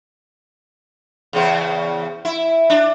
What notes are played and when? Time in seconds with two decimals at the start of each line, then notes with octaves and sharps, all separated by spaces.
1.33 E2 C#3 C5
2.25 E4
2.70 D4